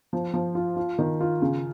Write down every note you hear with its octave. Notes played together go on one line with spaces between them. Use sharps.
F3
F3
F4
F4
D#3
F4
C#3